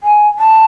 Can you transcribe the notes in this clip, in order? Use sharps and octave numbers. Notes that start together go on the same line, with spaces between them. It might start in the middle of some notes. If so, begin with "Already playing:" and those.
G#5
A5